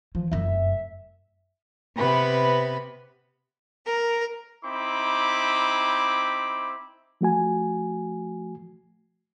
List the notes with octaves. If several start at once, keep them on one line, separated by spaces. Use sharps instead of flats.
E3 F3
F1 F#2 E5
C3 B3 B4
A#4
C4 D#4 E4 B5 D6
F3 A3 F#4 G#5